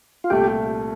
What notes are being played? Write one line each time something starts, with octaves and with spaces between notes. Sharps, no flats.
F4
C2 A#2 A3 G4